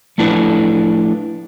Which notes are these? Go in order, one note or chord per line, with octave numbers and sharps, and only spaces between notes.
F3 A3 D4 E4 A4 B4